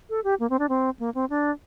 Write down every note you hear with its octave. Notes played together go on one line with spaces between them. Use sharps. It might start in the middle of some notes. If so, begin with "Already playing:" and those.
A4
G4
A#3
C4
D4
C4
A#3
C4
D4